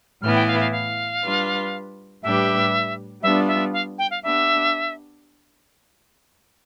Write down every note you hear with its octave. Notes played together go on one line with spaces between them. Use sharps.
A2 E3 B3 E4 F6
G5
F5
F5
F5
G3 D4 F4 B4
A2 G3 D4 G4 B4 E5
G3 B3 D4 F4 E5
E5
F5
G5
F5
B3 D4 G4 E5